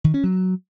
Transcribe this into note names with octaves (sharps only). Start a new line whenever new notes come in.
D#3
C#4
F#3